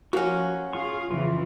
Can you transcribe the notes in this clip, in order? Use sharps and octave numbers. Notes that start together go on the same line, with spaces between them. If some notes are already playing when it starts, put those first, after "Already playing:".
F3 A#3 C#4 F#4 F#5 C#6
F4 G#4 F5 C#6
F2 C#3 E3 F4